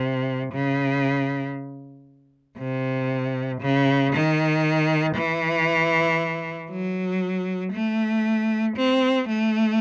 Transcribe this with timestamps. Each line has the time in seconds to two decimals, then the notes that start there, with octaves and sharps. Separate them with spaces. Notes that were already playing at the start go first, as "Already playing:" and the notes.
Already playing: C3
0.52 C#3
2.58 C3
3.61 C#3
4.13 D#3
5.15 E3
6.70 F#3
7.72 A3
8.77 C4
9.28 A3